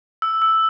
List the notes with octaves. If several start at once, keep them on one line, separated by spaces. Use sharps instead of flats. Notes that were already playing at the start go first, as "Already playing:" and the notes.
E6
E6